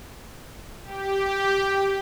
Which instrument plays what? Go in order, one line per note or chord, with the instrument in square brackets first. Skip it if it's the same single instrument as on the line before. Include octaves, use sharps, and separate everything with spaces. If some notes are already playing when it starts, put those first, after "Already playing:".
[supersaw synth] G4